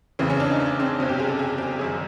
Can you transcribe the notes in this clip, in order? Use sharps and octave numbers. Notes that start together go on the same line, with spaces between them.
F1 E2 C#3 E3 C4
C#4
D4
D#4
C#4
C4
G1 F2 C3 C#4
G4
G#4
A4
G#4
G4
G1 F#2 D#3 G#4